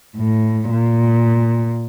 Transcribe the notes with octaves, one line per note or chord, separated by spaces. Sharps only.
A2
A#2